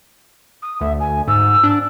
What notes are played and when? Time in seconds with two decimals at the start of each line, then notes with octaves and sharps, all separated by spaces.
0.62 D#6
0.81 D2 E5
1.00 G#5
1.28 G#2 E6
1.63 D4